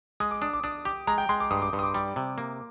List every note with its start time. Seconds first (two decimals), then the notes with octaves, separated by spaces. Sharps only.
0.20 G#3 D#6
0.31 D6
0.42 D4 D#6
0.54 D6
0.63 D4 D#6
0.85 G4 D6
1.07 G#3 A#5
1.18 G5
1.29 G#3 C6
1.40 D6
1.51 G2 D#6
1.62 D6
1.73 G2
1.79 D#6
1.83 D6
1.94 G3 D6
2.16 C3
2.38 A#3